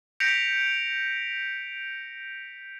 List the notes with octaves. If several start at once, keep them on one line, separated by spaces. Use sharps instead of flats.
G6 A#6 B6 C#7 D7 F7